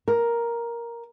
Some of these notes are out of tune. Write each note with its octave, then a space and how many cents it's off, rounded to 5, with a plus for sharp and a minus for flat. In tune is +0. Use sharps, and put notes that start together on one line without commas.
A#4 +5